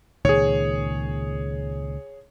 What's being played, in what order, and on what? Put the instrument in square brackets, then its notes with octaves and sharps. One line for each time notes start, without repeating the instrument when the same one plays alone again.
[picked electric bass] C#2 A#2 D#3 [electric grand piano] G#4 C#5